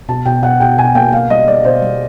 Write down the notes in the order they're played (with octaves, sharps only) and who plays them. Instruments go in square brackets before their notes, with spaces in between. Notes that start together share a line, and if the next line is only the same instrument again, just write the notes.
[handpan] B2 [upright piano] A5
[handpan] B2 [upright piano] G5
[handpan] B2 [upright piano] F#5
[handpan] B2 [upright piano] G5
[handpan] B2 [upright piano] G#5
[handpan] A#3 [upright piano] G5
[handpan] A#3 [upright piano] F5
[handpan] G3 [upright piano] D#5
[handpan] G3 [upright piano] D5
[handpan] B2 [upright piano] C5
[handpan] G3